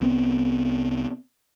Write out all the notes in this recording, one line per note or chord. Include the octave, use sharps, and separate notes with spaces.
C2 B3 C4